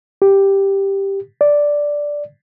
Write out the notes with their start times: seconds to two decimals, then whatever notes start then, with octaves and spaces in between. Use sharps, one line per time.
0.22 G4
1.41 D5